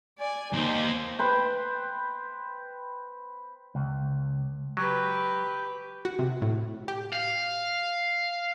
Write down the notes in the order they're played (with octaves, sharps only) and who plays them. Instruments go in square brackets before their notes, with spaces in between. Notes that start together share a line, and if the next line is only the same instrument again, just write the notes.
[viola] D5 G#5
[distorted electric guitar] D#2 [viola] D#4 C5
[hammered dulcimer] B4 C5 G5
[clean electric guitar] C#2
[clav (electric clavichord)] F#3 [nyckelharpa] G4 B4
[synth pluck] F#4
C3
A2
G4
[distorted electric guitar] F5